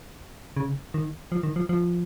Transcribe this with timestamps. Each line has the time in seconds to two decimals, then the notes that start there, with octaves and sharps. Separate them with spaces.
0.57 C#3
0.94 D#3
1.32 F3
1.43 D#3
1.56 F3
1.69 F3